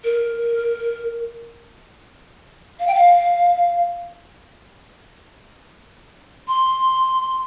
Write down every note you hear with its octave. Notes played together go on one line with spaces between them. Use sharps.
A#4
F5
G5
F5
C6